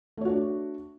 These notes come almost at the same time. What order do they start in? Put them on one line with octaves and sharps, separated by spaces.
A3 C#5 F#4 D4